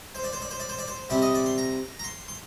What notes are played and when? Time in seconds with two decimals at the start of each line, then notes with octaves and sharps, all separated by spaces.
0.15 C5
0.24 D5
0.33 C5
0.42 D5
0.50 C5
0.60 D5
0.69 C5
0.79 D5
0.88 C5
1.10 C3 G3 C4 D5
1.22 D#5
1.35 D5
1.46 C6
1.58 A#5
1.99 A#5
2.04 C6
2.28 C6